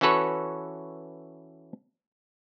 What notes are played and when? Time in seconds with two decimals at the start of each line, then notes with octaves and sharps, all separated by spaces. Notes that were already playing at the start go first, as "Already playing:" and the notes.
0.01 E3 C#4 F#4 A4 B4 C#5